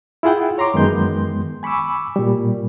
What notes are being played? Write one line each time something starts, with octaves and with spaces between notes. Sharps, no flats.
E4 F4 G#4 F#5 G5
C#5 A#5 C6 D6
F#2 D#3 G#3 B3 C6 G6
G#5 B5 C#6 D6 E6
A#2 G3